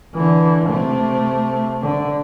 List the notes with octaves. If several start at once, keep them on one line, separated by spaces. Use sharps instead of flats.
D3 E3
C3 A3
D3